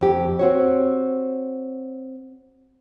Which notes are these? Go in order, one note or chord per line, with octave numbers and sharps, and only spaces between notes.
F2 G4
C4 F#4 C#5